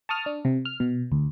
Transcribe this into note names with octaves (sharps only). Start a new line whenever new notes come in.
A5 C#6 D#6 F6
D4
C3
F6
B2
D2